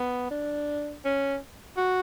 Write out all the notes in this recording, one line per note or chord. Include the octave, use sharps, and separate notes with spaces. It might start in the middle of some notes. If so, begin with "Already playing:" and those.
Already playing: B3
D4
C#4
F#4